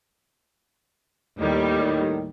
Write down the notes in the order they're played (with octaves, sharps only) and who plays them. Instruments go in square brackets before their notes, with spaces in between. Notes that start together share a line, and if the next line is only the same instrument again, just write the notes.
[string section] D#2 G3 [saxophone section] A2 D#3